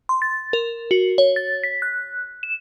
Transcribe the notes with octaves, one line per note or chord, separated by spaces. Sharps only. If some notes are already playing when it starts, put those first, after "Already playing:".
C6
A6
A#4
F#4
C#5
A6
B6
F#6
E7